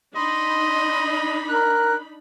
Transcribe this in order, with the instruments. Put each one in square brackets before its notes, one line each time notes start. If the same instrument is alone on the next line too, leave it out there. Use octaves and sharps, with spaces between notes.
[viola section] D4 D#4 B5 [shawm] D#5 [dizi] C6
[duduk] A#4 [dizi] F#6